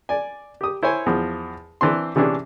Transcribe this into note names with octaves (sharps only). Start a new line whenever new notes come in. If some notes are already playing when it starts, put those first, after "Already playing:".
D5 G#5
G4 D#6
E4 C5 C#5 G#5
E2 F3
E3 C4 D4 C6
C3 E3 C#4 D4 G#4